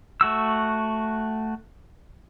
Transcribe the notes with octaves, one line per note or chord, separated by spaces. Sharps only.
A3 F#4 E6